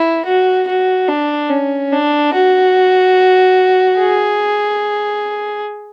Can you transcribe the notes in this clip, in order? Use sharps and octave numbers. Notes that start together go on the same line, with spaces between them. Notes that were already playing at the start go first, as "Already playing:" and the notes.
Already playing: E4
F#4
F#4
D4
C#4
D4
F#4
G#4